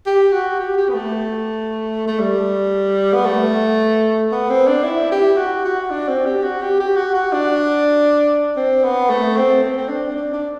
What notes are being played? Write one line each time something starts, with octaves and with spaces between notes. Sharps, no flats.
G4
F#4
G4
G4
B3
A3
A3
G3
B3
A3
B3
C4
D4
E4
G4
F#4
F#4
D4
C4
G4
F#4
G4
G4
F#4
F#4
D4
C4
B3
A3
C4
C4
C4
D4
D4
D4